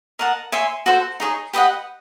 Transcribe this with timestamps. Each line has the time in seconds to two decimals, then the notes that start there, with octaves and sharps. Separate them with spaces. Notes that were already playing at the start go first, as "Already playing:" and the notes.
0.19 A#4 D#5 F#5 A5
0.52 C#5 E5 G#5 C6
0.86 F#4 A4 C5
1.20 D#4 G#4 C#5
1.53 G4 B4 D#5 F#5